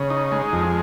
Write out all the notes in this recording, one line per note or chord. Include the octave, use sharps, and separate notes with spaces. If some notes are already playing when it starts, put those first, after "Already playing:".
Already playing: C#3
D#4
G#3
F2